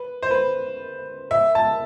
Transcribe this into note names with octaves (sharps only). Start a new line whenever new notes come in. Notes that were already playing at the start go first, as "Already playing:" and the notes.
Already playing: B4
C5
B4
E5
A5